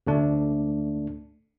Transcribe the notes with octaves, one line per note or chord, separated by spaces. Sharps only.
D2 A3 D4